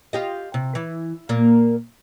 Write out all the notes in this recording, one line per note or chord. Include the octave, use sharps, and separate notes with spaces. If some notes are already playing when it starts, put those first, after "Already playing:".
F4 G4 D#5
C3
E3
A#2 A#3